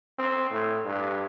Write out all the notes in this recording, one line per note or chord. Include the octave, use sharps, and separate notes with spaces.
C4
A2
G2